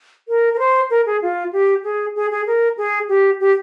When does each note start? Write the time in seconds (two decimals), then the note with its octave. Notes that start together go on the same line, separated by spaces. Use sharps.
0.28 A#4
0.54 A#4
0.59 C5
0.90 A#4
1.06 G#4
1.22 F4
1.53 G4
1.84 G#4
2.16 G#4
2.31 G#4
2.47 A#4
2.78 G#4
3.09 G4
3.40 G4